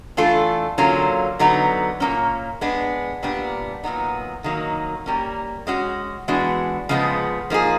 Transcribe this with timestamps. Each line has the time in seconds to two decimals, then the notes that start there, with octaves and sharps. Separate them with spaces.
0.17 E3 A3 D4 F4 A4
0.78 D3 F#3 A#3 C#4 F4
1.39 D3 F#3 B3 D#4
2.00 A#2 F#3 A#3 C#4
2.61 G#3 B3 D4
3.23 A#2 G3 B3 D4
3.83 A#2 F#3 B3 D#4
4.44 D#3 F#3 A#3 D#4
5.06 G3 A#3 C#4
5.67 G#3 C#4 F#4
6.28 E3 G#3 B3 D4 F#4
6.89 C#3 F3 G#3 B3
7.50 F3 A#3 D#4 G#4